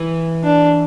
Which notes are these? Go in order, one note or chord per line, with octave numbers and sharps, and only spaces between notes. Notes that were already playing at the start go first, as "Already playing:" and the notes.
Already playing: E3
D4